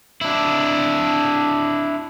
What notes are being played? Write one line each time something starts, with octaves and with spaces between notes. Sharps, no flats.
D4 E4